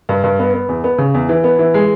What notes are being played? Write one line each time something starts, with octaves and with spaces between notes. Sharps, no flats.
G2
G2
B3
B3
E2
B3
C#3
E2
E3
B3
E3
G#3